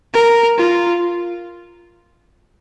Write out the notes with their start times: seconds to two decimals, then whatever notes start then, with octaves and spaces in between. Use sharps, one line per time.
0.14 A#4
0.58 F4